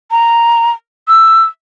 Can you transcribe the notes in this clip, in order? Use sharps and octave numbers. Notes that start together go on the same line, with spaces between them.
A#5
E6